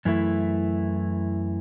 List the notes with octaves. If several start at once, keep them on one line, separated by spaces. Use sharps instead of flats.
F#2 E3 A3 E4